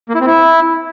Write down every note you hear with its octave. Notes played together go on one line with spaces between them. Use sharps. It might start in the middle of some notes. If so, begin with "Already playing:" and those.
A#3
E4
C4
E4